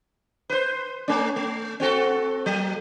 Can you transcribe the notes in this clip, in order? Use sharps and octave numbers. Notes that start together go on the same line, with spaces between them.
B4 C5
A3 C#4
A3
C4 F#4 A4
F#3 A#3